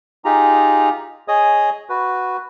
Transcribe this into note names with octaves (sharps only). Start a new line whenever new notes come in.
D#4 F4 G4 G#4 A#5
G#4 C#5 D#5 D#6
F#4 B4